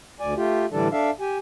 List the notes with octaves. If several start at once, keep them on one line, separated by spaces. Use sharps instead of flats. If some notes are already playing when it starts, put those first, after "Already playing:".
D2 D5 G#5
A3 F4 G4
A2 D3 E3 G3 D4 A4
D4 A4 E5 F5
G4 G#5